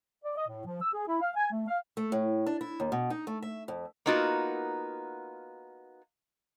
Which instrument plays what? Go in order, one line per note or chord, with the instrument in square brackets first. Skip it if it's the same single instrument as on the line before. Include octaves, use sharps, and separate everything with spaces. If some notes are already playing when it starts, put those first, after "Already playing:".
[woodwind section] D5
D#5
A2
F3
E6
G#4
E4
F5
G#5
A3
F5
[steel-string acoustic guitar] A3
A2
D4
E4
D#2
B2
D#4
A3
E5
F2
[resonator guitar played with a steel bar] A#3 B3 D#4 F4 F#4 A#4